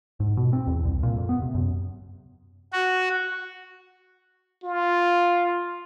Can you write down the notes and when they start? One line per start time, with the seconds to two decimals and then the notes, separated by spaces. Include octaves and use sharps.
0.20 G#2
0.37 B2
0.53 C4
0.67 E2
0.85 C2
1.03 A#2
1.16 F2
1.29 B3
1.42 C3
1.55 F#2
2.73 F#4
4.64 F4